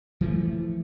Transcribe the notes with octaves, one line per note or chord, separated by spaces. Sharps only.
E3 F3 A3